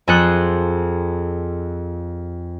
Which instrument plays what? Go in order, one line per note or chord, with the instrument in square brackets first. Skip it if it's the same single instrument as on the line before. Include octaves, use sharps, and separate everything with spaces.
[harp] F2 G#4 A4 C5 F#6 C#7